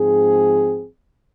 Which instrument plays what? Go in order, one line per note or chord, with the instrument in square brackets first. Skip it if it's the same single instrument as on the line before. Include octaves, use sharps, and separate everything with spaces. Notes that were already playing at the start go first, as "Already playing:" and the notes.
Already playing: [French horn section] G#2 F3 C4 G#4